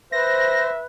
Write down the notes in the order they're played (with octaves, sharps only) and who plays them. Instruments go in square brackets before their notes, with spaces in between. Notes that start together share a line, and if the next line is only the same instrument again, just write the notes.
[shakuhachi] B4 [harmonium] C5 [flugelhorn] E5 [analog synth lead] A#6